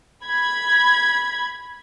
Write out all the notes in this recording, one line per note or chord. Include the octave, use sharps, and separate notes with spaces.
B5 G#6